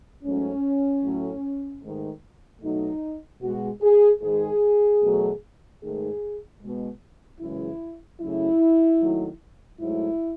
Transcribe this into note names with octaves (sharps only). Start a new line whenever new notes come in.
G#2 F#3 A3 C#4
A2 F#3 A3
G#2 D#3 A3
B2 F#3 A3 D#4
B2 G#3 F#4
G#4
G#2 D#3 G#3 G#4
E2 B2 F#3 A3
G#2 D#3 A3 G#4
B2 G#3
F#2 C#3 E3 G#3 E4
F#2 C#3 F#3 A3 E4
D#2 D#3 F#3 A3
G#2 F#3 A3 E4